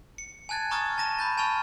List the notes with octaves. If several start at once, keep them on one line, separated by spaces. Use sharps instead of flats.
C#7
G#5 A5 F#6 G#6 A6
A#5 C#6 D#6 F6 G#6 A6
A5 A#5 A#6 D#7 E7
B5 G6 A6
G#5 A5 B5 C#6 F6 F7